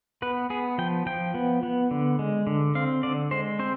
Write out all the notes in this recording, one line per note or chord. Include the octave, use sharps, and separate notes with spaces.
B3 B4
B3 G#4
F3 G5
F3 G5
B3
B3
D3
G#3
D3
C4 F5
D3 D5
G#3 C5
C4 C5